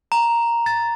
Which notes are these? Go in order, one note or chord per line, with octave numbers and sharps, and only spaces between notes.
A#5
A6